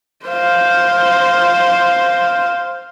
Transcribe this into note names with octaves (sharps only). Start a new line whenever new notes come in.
C5 F5